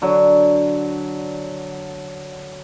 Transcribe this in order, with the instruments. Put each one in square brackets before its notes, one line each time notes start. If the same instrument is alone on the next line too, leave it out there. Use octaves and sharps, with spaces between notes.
[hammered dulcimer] D3 F#3